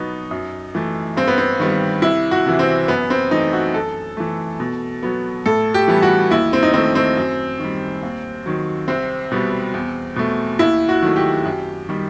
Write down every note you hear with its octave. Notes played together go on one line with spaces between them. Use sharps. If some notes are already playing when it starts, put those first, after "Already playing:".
Already playing: B2 F#3 B3 D#4
F#2
E3 A3
G2 C4
B3
C4
D#3 G3 B3
C2 E4
F#4
C3 E3
C4
F#2 B3
C4
E3 A3 D#4
F#4
F#2 A4
E3 A3
B2
F#3 B3
A2 A4
G4
E3 G3 B3
F#4
D#2 E4
C4
D#4
D#3 A3 C4
C4
F#2
D#3 G3
D#2
D#3 F#3
C2 C4
B2 G3 B3
E2
B2 A3
D#2 E4
F#4
D#3 F#3 A3
G4
F#2
D#3 G3